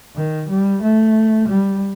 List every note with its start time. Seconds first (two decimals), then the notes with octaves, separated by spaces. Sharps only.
0.16 D#3
0.49 G3
0.83 A3
1.48 G3